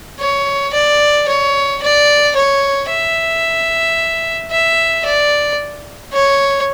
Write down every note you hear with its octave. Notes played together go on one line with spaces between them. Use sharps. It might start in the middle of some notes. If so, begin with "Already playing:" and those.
C#5
D5
C#5
D5
C#5
E5
E5
D5
C#5